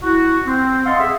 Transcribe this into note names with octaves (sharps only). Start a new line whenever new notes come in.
E4 F#4
C4
D#5 F5 F#5 A5 C6
G#4 E5